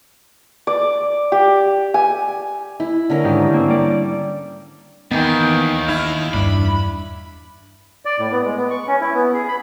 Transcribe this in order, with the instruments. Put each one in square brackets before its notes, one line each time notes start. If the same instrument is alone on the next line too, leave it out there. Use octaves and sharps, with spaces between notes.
[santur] D5
G4
G#5
[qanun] E4
D3 C#4 A#4
[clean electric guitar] G#2 D#3 G4
A#3 C4
G3 G4 D5
[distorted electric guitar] D#2 [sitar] D#3 E3 [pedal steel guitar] B3 G5
[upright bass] D4 [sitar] E4 [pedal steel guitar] F5
[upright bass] E2 G2 [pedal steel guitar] D4 [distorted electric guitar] B5
[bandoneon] D5
A2
B3
G#3
B3
C#6
C#4
E4
B3
G#4
B5